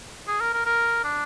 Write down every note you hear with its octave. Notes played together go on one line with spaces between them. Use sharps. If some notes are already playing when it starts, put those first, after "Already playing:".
G#4
A#4
A#4
A#4
D4